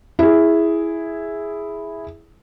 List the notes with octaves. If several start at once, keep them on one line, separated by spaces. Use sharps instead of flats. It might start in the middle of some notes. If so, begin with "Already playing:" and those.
E4 G#4